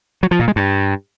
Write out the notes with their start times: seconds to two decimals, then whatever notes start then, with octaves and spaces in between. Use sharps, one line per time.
0.23 F#3
0.31 F3
0.39 A#2
0.48 G#3
0.56 G2